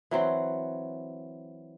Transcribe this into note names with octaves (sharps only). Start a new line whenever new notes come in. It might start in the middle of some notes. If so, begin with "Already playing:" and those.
E3 F#3 C4